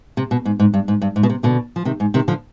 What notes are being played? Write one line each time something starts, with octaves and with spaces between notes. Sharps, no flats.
C3
B2
G#2
G#2
G2
G#2
G2
G#2
B2
C3
B2 D3
F3
C3 D#3
G#2
C3 D#3
D3 F3